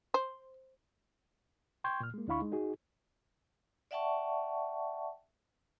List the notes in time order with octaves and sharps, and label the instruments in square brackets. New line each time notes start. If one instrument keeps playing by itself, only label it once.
[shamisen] C5
[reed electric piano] G5 C6 C#6 G6 G#6
A#2 F6
G#3 A#3
D2 D4 E4 F5 B5 C#6
G#3 D#4
D#4 F#4 G#4
[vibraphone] D5 E5 F#5 G5 A5 C#6